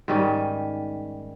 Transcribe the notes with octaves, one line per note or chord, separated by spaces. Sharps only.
G#2 D#3 G3 C#4